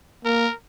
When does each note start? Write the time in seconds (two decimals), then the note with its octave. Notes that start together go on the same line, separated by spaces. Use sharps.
0.25 A#3 A#4